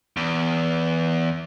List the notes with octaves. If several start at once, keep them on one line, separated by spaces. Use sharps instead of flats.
E2